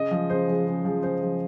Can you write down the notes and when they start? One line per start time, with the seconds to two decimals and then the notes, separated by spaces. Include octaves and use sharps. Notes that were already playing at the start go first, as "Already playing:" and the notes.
Already playing: C#3 D#5
0.11 F3 G#3
0.30 C#3 C5
0.48 F3 G#3
0.67 C#3
0.85 F3 G#3
1.03 C#3 C5
1.21 F3 G#3